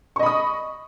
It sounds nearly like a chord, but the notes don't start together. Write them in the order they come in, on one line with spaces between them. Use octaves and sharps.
C#6 D#5 B5 D#6